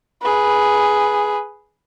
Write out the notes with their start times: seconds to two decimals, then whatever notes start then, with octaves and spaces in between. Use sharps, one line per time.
0.22 G#4 B4